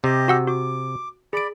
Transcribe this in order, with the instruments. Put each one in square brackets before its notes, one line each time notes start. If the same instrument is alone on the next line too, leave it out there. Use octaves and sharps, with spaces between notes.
[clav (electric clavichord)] C3 [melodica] G4 D#5
[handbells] F#4 F#5 E6
[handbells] F#4 [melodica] D6
[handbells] G#4 D7 [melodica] D5 B5